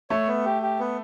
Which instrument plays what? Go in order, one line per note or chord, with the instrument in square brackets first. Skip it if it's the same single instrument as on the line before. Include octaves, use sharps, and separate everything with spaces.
[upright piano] A3 [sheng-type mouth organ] C#5
[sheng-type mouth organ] B3
G4
G4
B3